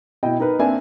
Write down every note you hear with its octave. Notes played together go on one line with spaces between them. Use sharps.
B2 E4 D#5 G5
D#4 A#4 B4
A#3 C4 D4 A#4 E5 G#5